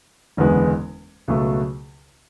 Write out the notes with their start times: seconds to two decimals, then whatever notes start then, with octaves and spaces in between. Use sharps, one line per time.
0.37 F#1 E2 D3 G#3 B3
1.28 C#2 B2 F#3 A3